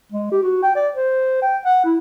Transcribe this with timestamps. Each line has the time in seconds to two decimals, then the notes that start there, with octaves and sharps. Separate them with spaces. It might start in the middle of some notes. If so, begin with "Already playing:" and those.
0.12 G#3
0.32 G4
0.43 F#4
0.63 G5
0.75 D5
0.96 C5
1.42 G5
1.65 F#5
1.84 E4